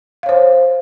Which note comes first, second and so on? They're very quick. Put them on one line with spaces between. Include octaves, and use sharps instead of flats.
F5 C#5 C5